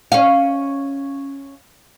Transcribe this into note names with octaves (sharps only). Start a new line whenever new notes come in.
C#4 F5